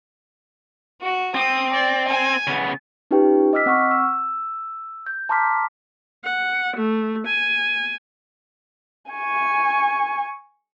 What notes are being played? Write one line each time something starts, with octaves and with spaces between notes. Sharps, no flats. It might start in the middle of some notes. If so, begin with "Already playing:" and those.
F#4
C4 D#6
D5
G#5
C#3 B3
C#4 D#4 F4 G4 B4 G5
D#5 D6 E6 F6 B6
C4 F#5 C#6 F6
E6
G6
A5 A#5 C6 D6 F6 B6
F#5
A3
G#5
G#5 C#6